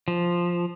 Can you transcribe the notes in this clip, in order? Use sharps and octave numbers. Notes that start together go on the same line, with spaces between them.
F3